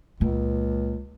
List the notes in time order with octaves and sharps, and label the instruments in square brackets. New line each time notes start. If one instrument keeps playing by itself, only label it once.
[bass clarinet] C#2 [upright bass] A#2 A#3